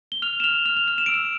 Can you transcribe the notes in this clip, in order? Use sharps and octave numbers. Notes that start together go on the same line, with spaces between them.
G7
F6 F7
E7
F6 F7
F6 F7
F7
F6 F7
E7
E6 D7
E7